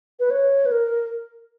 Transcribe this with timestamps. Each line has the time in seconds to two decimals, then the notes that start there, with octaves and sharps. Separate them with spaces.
0.20 B4
0.30 C#5
0.66 B4
0.72 A#4